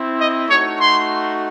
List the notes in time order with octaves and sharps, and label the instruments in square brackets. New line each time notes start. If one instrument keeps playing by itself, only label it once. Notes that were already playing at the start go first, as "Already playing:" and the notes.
Already playing: [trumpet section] C4 E4
D#5
A3 D#4 F#4 C#5
C6